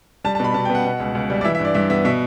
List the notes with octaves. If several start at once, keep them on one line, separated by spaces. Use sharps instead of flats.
G3 A5
A5
B2 B5
B2 A5
G5
B3
F#5
B2
C#2
C#2
G3
D5
E3 E5
E5
G2 D5
G2 E5
B3 E5
B2 E5